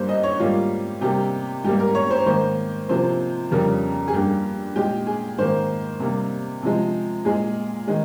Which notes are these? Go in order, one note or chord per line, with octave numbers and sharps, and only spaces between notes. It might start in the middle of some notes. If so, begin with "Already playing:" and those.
Already playing: G2 G3 A#3 C5
D#5
C#5
G#2 G3 A#3 F4
C3 G3 A#3 G4
G#2 G3 A#3 G4
A#4
C#5
C5
G#2 D#3 A#3 C5
C3 F3 A#3 C5
F2 C#3 G3 A#4
G#4
G2 G3 A#3 G4
A#2 G#3 G4
G#4
G#2 D#3 A#3 C5
C3 G3 A#3
C3 F3 G#3
A#2 G#3 G#4
D#3 G#3